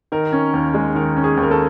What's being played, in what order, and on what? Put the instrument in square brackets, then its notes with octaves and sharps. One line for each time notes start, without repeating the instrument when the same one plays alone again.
[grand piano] D#3 A#4
C#4
D#2
G#3
D#3 A#4
C#4
G#4
D#2
A#4
A4